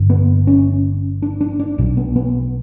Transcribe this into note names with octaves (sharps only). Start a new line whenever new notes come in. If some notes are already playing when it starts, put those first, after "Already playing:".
Already playing: G1 G2 D3
B3
C#4
D4
D4
D4
B1 B2
B3
B3